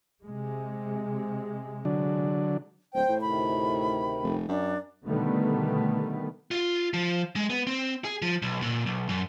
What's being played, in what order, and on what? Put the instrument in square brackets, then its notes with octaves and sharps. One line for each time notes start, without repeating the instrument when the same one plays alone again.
[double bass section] C3 G#3
[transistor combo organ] D3 F#3 D4
[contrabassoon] D1 [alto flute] C5 [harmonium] G5
[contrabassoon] A2
[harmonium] D2 C3 D#3 [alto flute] B5
[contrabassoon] F1
[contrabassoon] F#2 [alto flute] D4
[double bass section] B2 D3 D#3 G3 A3 B3
[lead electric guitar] F4
F3
G#3
B3
C4
G#4
F3
B1
A#2
B1
F#2